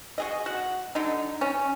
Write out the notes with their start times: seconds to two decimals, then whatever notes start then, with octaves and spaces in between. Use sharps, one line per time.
0.18 F#4 G#4 D#5
0.46 F#4 F#5
0.95 D3 F#3 D#4
1.41 C#4